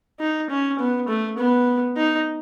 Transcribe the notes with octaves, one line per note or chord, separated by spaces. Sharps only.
D#4
C#4
B3
A3
B3
D#4